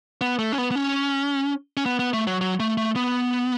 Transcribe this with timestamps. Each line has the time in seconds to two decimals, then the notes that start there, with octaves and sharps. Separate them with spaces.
0.21 B3
0.39 A3
0.52 C#4
0.58 B3
0.71 B3
0.75 C#4
1.77 C#4
1.86 B3
1.99 B3
2.13 A3
2.27 F#3
2.41 F#3
2.60 A3
2.77 A3
2.96 B3